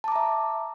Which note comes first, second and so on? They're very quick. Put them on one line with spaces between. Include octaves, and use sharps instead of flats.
A5 D6 A#5 E5